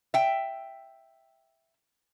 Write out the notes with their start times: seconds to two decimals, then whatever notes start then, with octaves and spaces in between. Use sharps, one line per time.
0.14 E5 G5